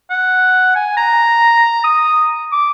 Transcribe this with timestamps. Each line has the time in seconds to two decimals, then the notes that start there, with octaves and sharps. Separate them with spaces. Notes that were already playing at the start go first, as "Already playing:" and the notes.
0.10 F#5
0.75 G#5
0.97 A#5
1.84 D#6
2.52 D6